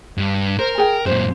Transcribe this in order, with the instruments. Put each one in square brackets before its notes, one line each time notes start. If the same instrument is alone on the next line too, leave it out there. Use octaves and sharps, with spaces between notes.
[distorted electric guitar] G2
[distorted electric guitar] A#4 [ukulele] C5
[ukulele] G#4 G5
[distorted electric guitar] F#2 A#2 [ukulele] C5